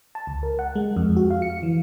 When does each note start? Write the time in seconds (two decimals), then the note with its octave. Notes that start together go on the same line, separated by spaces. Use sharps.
0.15 A5
0.27 C#2
0.43 A#4
0.59 F#5
0.76 G#3
0.96 F2
1.17 F#4
1.30 F5
1.42 C#7
1.63 E3